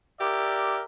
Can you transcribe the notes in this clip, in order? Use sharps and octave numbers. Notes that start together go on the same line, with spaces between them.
G4 A#4 D5 E5